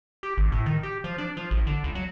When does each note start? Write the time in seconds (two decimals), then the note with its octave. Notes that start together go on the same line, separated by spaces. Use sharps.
0.23 G4
0.37 G#1
0.52 A2
0.66 D#3
0.83 G4
1.04 F3
1.18 D4
1.37 F3
1.51 A1
1.67 D3
1.84 C#2
1.95 F#3